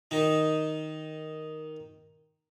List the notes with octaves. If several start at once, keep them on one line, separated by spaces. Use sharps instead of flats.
D#3 D#4